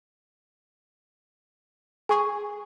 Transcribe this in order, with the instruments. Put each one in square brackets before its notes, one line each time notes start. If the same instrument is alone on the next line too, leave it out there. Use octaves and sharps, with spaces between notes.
[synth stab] G#4 [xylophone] G#5 C#6